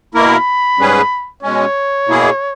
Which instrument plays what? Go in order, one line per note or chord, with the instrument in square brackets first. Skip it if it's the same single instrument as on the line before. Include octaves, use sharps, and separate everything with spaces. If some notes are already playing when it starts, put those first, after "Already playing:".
[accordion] B2 A#3 E4 A#4 [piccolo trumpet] B5
[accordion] G#2 G3 C#4 G#4 B4
[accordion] B2 G#3 C#4 [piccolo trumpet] C#5
[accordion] B2 A#3 E4 G#4